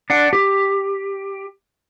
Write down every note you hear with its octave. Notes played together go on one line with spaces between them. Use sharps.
D4 F#5
G4